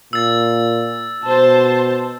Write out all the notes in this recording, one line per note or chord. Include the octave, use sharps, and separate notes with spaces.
A#2 E6 A6
B2 C5 A5